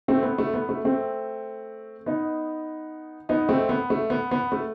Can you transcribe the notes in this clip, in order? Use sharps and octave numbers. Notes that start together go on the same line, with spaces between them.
A3 C4
B3
A3
B3
A3
A3 C4
B3 D#4
B3 D#4
A3 C4
B3
A3
B3
B3
A3